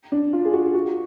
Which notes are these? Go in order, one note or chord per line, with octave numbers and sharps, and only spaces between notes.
D4
F4
G#4
F#4
F#4